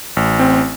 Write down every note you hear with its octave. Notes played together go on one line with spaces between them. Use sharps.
A1
C4